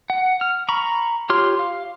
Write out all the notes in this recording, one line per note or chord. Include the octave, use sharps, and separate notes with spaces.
F#5
F6
A#5 B5 C#6
F4 G4 C#5 C6 F6
F5